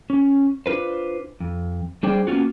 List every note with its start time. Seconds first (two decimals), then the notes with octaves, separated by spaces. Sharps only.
0.10 C#4
0.66 D4 F4 B4 C5
1.40 F2
2.03 G3 D4 G#4 C5 D5 G5
2.27 A#3 B3 C#4 F4 F#4